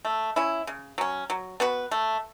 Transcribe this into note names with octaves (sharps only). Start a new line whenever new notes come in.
A3
C#4 E4
C#3
F#3 C#4
F#3
B3 F#4 B4
A3